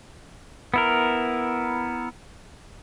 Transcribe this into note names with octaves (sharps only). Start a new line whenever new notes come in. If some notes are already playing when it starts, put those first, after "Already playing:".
B3 E4 A#4